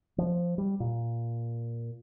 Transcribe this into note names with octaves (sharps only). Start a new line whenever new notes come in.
F3
G3
A#2